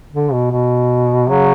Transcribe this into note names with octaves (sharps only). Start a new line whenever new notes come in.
D3
B2
B2
C#3 F#3